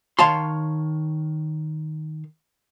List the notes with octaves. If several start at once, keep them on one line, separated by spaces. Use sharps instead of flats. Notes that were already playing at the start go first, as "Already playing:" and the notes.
D#3 C#5 F5 A5 C6